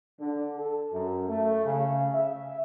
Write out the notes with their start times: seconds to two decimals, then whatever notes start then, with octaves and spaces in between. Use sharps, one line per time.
0.20 D3
0.56 A4
0.93 F#2
1.28 A3
1.66 C#3
2.14 E5